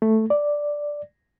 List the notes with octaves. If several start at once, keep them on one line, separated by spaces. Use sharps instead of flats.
A3
D5